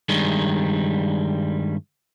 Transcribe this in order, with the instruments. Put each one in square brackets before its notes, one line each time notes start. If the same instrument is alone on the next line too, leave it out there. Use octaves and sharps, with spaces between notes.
[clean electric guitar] G2 D#3 G3 G#3